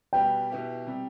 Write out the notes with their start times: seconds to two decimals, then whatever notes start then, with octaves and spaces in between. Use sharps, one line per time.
0.13 B2 G3 B3 G5
0.50 B2 B3 E4 G4
0.87 C3 G3